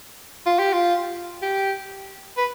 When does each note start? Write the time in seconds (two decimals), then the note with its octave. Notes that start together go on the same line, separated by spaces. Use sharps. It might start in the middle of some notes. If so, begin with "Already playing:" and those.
0.46 F4
0.59 G4
0.73 F4
1.42 G4
2.37 B4